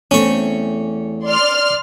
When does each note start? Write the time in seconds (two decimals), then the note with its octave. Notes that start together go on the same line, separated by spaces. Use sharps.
0.11 E2 A3 C4 C#4 C#6
1.26 D5 C6 F6